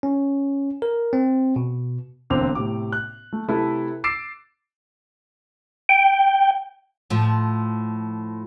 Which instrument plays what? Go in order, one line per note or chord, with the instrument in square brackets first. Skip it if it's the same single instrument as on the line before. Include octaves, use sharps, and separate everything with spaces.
[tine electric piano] C#4
A#4
C4
B2
[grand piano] E1 D3 A#3 C4 D6 F7
A2 C3 D6
F#6
A3
C3 A3 E4 A4 B4
D6 E6 A6 C7 D7 E7
[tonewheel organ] G5
[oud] A2 F3